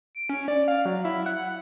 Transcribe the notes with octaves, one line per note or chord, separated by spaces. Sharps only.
D7
C#4
D5
F5
F#3
E4
F#5